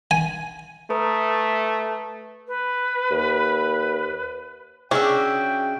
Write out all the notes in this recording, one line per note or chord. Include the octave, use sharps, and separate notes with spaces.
G#5
A3 B4 A#5 D#6
B4
D#2
C#3 C#4 D4 F#4 E5 G5